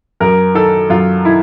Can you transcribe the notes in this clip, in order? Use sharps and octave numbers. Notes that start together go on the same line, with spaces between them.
F#2 A#4
D#3 A4
F#2 F4
D#3 E4